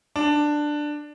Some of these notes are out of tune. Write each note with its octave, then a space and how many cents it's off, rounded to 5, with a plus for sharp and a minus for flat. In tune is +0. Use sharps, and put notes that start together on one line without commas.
D4 +10